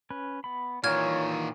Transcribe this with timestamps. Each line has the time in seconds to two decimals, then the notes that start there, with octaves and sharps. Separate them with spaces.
0.10 C#4 B4
0.44 B3 B5
0.84 A#2 D#3 E3 F4 C#5 F6 G#6